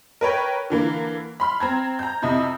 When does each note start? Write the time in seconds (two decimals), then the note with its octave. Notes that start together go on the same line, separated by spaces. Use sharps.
0.21 A#4 B4 C#5 G5
0.70 D3 E3 A#3
1.40 B5 C6 F6
1.60 C4 A#5 G#6
1.99 A#5 G6
2.22 F2 C3 E4 D#5